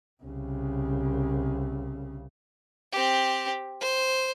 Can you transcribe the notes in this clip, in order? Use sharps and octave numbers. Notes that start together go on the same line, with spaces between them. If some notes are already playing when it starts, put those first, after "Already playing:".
C2 C#3
C4 G4
C5